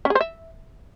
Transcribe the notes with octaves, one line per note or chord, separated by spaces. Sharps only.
C#4
G#4
C5
E5